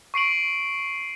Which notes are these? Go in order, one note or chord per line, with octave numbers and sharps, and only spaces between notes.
C#6 C7 D7 F#7